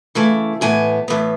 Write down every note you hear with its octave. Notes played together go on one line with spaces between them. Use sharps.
C#3 E3 A3
A2 E3 B3 G#5
A2 E3 B3